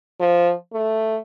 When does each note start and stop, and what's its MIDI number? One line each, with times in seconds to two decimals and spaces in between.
0.20 0.52 53
0.73 1.19 57